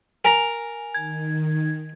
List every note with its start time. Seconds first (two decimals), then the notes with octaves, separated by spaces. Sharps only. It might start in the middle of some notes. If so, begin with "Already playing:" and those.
0.25 A#4 G#5 A#5
0.94 D#3 G#6